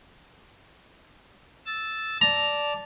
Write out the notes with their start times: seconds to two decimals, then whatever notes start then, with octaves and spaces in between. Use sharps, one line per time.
1.66 E6 A6
2.21 D5 A5 A#5